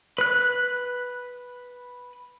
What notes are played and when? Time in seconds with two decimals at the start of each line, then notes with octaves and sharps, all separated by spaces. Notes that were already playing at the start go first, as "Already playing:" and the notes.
0.18 B4 F#6